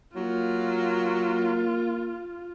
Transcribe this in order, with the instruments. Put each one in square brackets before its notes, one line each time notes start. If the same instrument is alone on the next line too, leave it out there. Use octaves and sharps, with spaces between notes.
[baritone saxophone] F#3 [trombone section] A#3 [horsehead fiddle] F4